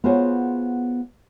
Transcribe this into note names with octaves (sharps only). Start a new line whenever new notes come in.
B3 F4 F#4 G#4 C5 C#5